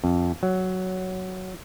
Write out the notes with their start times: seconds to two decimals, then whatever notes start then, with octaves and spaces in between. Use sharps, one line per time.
0.04 F2
0.43 F#3